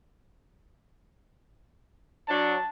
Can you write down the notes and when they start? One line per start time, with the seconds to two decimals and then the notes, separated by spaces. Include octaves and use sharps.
2.28 F#3 D4 A5